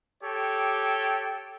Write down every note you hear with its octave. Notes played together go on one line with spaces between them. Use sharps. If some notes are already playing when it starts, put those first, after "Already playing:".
G4 A4 C#5 G5